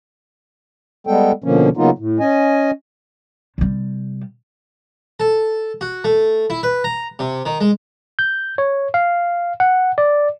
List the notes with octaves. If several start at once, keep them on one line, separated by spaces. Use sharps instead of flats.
G3 G#3 B3 A4 G5
B2 D3 F3 A#3 C#4
C#3 F#3 A#3 B3 D#4 F4
A2
C#4 D#5 G#5
C3 G3
A4
F#4
A3
E4
B4
A#5
C3
D#3
G#3
G6
C#5
F5
F#5
D5